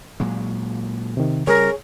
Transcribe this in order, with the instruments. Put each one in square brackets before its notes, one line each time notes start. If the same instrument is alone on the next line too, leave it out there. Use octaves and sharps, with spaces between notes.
[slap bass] A#2 F#3 G#3
[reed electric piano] C3 D#3
[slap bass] C#3 G3 [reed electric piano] G#4 C#5 [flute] A#4